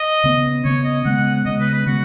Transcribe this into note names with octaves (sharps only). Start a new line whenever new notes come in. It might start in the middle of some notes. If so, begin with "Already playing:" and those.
Already playing: D#5
C#3 B3
C#3 B3 C#5
D#5
C#3 G#3 B3 F#5
C#3 G#3 B3 D#5
B4
B4
C#3 G#3 B3 F#4